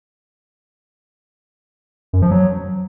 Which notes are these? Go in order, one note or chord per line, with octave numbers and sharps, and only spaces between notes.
F#2
F3
F#3